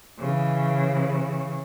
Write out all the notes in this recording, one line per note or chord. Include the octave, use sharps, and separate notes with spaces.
C#3 E3